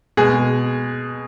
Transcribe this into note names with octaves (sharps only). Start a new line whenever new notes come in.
B2 G#3 G#4